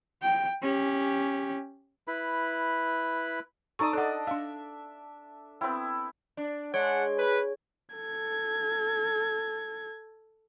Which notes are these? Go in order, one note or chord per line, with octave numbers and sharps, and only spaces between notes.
G5
C#4 G4
E4 B4 B5
D#4 A4 D5 A#5 C#6 D#6
D4 A4 D#5 F#5
D4 E5 F5
B3 C4 E4 G5
D4
G#3 D4 C#5 F#5
B4
A4 G#6